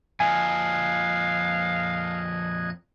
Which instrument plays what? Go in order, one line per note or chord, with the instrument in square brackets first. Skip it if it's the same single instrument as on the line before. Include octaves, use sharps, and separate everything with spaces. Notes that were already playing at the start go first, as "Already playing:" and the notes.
[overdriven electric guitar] F2 A#2 [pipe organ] D#5 F#6 G#6 [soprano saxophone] F5 [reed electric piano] G#5